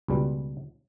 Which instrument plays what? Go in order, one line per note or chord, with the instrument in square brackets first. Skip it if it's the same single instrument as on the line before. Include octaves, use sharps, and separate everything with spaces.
[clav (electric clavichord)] C#2 B2 G3